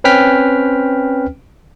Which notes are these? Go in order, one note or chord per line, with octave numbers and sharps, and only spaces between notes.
C4 C#4 B4 G5 F6 B6